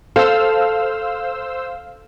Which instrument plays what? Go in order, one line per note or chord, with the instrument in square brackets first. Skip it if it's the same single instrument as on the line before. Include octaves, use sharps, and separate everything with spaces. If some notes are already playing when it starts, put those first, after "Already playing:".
[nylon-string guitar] A4 [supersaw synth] C5 E6 [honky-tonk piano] F5